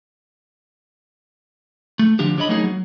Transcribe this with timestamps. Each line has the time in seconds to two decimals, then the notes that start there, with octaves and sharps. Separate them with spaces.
1.99 A3
2.19 D3 F3 D4 G4
2.37 D3 D4 C#5 D#5 B5
2.49 F#3 A3 A#3 C#4 D#4 G#4
2.64 F#3